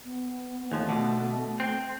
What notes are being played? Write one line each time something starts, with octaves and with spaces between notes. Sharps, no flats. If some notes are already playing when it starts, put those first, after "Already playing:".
B3
D#2 F3 A3
B2 D3
C4